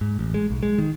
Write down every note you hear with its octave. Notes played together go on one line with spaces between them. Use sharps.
G#2
A1
G#3
B1
G#3
D#3